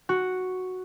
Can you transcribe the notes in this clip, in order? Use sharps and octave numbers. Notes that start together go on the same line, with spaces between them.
F#4